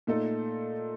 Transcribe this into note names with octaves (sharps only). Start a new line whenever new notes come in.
A#2 A3 D#4 A4